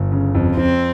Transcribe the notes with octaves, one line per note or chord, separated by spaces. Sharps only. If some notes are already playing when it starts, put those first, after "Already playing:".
Already playing: G1
C#3
F2
F2 C4